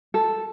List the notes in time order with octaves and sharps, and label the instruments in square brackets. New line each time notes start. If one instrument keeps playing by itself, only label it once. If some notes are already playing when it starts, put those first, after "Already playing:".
[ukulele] A4